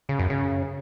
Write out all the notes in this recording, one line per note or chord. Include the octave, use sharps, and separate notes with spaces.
C#3
F#2
C#3